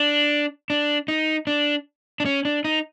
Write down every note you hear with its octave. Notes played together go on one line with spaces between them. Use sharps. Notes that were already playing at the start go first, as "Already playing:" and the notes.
Already playing: D4
D4
D#4
D4
D4
C#4
D4
D#4